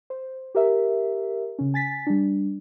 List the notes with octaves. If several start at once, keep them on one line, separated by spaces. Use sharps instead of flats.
C5
G4 A#4 E5
C#3 C#4
G#5 A6 B6
G3 D4